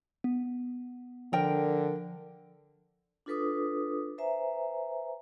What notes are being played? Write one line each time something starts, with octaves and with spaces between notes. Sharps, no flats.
B3
D3 F3 A#4 G5
D4 F4 A4 B4 D6 D#6
B4 C5 E5 G#5 A#5